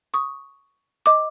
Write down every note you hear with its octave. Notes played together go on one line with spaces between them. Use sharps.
C#6 D#6
D#5 D6